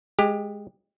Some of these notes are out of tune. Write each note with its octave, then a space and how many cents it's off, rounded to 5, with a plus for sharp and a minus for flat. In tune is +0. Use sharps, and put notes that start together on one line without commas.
G#3 +0 G4 +20